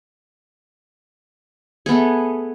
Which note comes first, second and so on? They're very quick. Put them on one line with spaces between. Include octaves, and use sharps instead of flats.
G#4 B3 A3